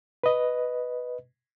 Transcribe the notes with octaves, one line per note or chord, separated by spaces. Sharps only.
B4 D#5